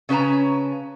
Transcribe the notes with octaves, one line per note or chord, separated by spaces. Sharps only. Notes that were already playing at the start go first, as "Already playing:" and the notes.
C#3 C#4 B4 A5 A#5